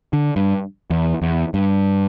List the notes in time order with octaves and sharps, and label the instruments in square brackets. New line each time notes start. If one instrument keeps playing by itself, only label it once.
[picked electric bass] D3
G2
E2
E2
G2